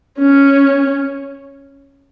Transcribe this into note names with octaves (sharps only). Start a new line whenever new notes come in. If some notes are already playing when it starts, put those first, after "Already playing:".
C#4